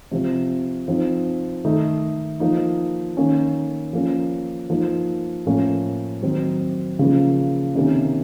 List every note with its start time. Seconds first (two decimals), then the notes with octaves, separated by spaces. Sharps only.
0.11 C3 F3 C4
0.88 F3 C4 D#4
1.65 D#3 A3 D#4
2.40 F3 A#3 D#4
3.17 D#3 A#3 C#4
3.93 F3 A#3 C#4
4.70 F3 A#3 D#4
5.46 A2 F3 A#3 C#4
6.22 D#3 F#3 C4 D#4
6.99 C#3 F3 A#3
7.75 C3 D#3 A#3 C#4